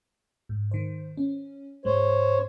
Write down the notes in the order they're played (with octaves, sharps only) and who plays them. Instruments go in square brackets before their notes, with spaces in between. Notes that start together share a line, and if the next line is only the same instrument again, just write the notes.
[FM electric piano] G#2
D#3 C5
C#4
[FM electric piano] G#2 G#3 [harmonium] C5 C#5